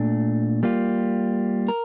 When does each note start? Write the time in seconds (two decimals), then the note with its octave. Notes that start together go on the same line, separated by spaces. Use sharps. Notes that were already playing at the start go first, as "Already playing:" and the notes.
Already playing: A#2 A3 D4
0.63 G3 A#3 F4
1.68 A#4